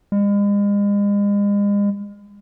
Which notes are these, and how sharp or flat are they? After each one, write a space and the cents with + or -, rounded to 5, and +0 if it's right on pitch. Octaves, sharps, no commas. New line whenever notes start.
G#3 -40